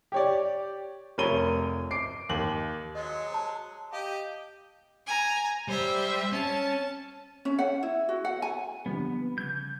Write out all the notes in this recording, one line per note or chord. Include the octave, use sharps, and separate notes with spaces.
G4 C#5 D5
F1 A#4 C#5 B5 D#7 G7
D6 C7 D7
D#2 F#7
F#3 G#3 D#5
C#5 A5
G4 D#5 F5
G#5 A#5
G3 C5 E5
C#4 A5
C#4
F#5
E4
F#4
F#5
G#5
D3 F3 G3 B3
C#3 G6 G#6